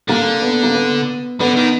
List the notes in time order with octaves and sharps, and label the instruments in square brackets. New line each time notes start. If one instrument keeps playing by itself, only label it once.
[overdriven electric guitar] D3 [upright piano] A#3
[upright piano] B3
A#3
B3
[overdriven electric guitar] D3 [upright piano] B3
[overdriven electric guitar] D#3